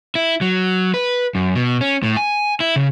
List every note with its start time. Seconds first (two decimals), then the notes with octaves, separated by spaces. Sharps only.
0.15 E4
0.41 F#3
0.94 B4
1.35 F#2
1.55 B2
1.81 C#4
2.03 A2
2.17 G#5
2.60 E4
2.76 C#3